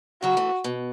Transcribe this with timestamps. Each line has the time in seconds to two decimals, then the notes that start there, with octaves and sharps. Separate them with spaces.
0.22 C#3 F#3 F#4
0.37 E3 A3
0.64 B2